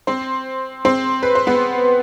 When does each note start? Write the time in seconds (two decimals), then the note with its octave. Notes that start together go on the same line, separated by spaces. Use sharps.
0.07 C4 C5
0.85 C4 C5
1.23 B4
1.35 C5
1.47 B3 B4